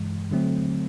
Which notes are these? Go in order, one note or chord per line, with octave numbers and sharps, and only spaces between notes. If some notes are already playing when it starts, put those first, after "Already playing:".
Already playing: G2 E3 G#3
D3 F#3 A3 C4